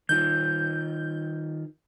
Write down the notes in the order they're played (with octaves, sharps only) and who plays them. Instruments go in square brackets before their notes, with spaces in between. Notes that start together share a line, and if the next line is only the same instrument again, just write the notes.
[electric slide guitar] D#3 D#4 F4 [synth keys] G6